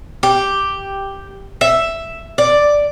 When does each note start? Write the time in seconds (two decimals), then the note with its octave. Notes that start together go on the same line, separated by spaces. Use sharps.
0.23 G4
1.61 E5
2.38 D5